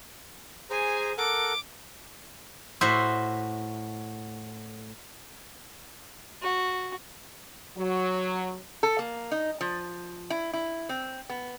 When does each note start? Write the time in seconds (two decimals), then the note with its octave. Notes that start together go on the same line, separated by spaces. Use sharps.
0.70 G#4 C5 G#5 A#5
1.18 A4 A#4 F#5 D6
2.81 A2 F#4 C5 E5
6.42 F#4
7.77 F#3
8.83 A4
8.99 A#3
9.31 D#4
9.61 F3
10.30 E4
10.53 E4
10.89 C4
11.29 B3